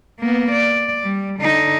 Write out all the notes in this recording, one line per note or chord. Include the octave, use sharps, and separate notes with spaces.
A#3 B3
D5
G3
D3 D#4